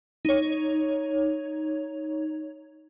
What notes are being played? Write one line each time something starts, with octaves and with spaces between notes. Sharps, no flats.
D#4 C#5